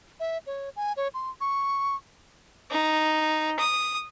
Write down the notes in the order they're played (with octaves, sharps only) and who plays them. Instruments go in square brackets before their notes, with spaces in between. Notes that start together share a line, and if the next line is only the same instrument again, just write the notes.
[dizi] E5
C#5
G#5
C#5
C6
C#6
[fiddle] D#4
D#6